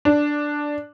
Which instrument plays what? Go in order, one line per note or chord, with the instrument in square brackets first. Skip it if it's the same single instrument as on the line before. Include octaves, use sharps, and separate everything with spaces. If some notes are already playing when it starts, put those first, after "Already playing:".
[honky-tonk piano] D4